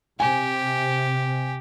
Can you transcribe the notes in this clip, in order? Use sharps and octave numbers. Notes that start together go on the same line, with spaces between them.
C3 G4 G#5